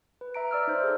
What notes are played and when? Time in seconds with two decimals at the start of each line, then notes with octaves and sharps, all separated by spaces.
0.21 B4
0.34 E5 A#5 D7
0.51 D5 E6 F6
0.67 D#4 C5
0.83 G#4 A4